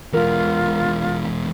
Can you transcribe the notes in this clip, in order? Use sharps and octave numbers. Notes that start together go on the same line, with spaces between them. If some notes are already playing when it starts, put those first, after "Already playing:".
E2 G#3 F4 A#4